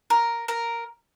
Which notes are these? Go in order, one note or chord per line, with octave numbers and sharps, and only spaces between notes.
A#4
A#4